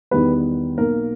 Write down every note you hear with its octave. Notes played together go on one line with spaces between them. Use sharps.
E2 D#3 G3 B3 B4
B1 B2 A#3 A#4